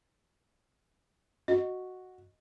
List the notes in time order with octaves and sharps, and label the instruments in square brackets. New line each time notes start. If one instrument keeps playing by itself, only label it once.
[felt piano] F#4 [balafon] D#5